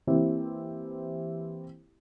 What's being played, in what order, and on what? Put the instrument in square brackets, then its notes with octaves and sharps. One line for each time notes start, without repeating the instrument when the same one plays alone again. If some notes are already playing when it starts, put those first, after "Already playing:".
[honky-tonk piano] E3 A#3 C4 E4 G4